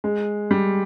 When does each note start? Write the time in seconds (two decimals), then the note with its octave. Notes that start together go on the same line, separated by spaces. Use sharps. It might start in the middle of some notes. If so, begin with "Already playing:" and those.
0.04 G#3
0.51 G3